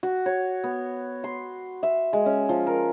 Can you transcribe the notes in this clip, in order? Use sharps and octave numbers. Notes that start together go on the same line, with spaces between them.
F#4
C#5
B3
C6
E5
G#3
C#4
F3
A#4